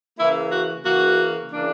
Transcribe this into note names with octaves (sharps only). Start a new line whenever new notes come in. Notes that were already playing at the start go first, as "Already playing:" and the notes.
C#3 E3 A#3 E4
F#4
C#3 E3 A#3 F#4
C#3 E3 A#3 D4